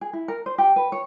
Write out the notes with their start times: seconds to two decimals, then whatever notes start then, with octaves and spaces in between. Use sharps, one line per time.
0.01 G#4
0.13 E4
0.28 A#4
0.46 C5
0.58 G4
0.76 B4
0.92 C#5